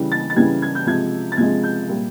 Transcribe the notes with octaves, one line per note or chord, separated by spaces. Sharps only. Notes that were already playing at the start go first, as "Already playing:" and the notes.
Already playing: C#3 E3 G3
A6
A6
C#3 E3 G3 G#6
G#6
G6
C3 F3 G#3 G#6
A6
C3 F3 G#3 G#6
G6
A#2 G3